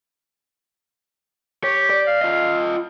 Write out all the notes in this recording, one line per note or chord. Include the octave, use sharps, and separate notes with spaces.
G4 C#5
D5
F5
F4 D#5